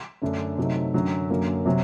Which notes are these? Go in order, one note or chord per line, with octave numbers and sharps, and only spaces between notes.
F#2 D3 A3 D4
C3 F#3 A3 D#4
F#2 D3 F#3
F#2 D3 F#3 A#3
C3 F#3